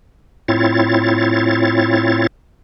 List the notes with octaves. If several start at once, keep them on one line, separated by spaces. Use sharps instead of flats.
A2 C4 E4 F4 C#5 A6